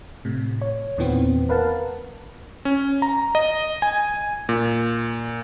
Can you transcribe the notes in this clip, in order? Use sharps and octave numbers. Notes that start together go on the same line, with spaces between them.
A2 C3
C#5
E2 A#2 D#3 E3 B3 C4
A#4 B4 F5 F#5 A5
C#4
A#5
D#5
G#5
A#2